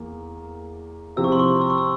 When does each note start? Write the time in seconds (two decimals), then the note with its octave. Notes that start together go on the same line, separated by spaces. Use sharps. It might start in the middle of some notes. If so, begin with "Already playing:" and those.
Already playing: E2 A#3
1.16 C3 F3 C4 E4 E6
1.24 C#6
1.32 C6
1.39 C#6
1.61 E6
1.70 C#6
1.78 E6